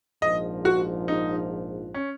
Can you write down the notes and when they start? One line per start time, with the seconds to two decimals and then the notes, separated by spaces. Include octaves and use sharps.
0.22 A#1 G#2 F3 D#5
0.65 F#4
1.08 D#4
1.94 C#4